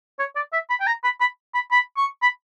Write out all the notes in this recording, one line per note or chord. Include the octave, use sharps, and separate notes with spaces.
C#5
D5
E5
B5
G5
A#5
B5
B5
B5
B5
C#6
B5